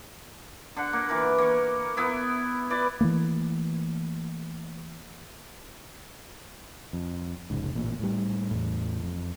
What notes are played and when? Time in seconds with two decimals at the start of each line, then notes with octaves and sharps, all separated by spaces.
0.77 D3 F#5
0.93 A#3
1.09 E3 A#4
1.38 A#3 C#6
1.97 B3 E4 E5
2.70 E4 B4 D5
3.01 E3 F3 A3 A#3
6.93 F2
7.50 F1 C#2 G#2
7.74 A1 A#2
7.99 A2 G3
8.51 E2 A2
9.03 F2